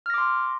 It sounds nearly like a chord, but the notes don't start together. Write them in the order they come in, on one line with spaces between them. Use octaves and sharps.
F6 A#6 D6 C6